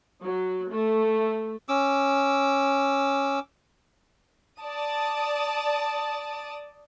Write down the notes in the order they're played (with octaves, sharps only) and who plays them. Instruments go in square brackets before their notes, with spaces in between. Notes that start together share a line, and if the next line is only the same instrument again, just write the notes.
[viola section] F#3
A3
[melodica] C#4 D6 E6
[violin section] D5 A5 D#6